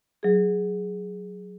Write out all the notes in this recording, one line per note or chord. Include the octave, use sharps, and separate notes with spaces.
F#3 G#4